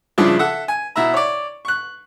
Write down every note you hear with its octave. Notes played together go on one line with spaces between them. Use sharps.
G2 C#3 F3 D4 E4
A4 E5 F#5
G#5
B2 E4 E5 A#5
C#5 D5
C#6 F#6